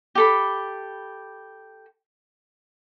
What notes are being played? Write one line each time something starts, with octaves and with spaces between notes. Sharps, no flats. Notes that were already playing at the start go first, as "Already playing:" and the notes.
G4 A4 B5